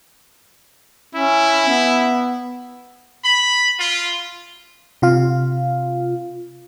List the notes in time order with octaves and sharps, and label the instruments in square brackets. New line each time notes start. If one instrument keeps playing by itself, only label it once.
[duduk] C#4 [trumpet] E4
[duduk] B3
[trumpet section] B5
F4
[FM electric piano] C3 F4 F5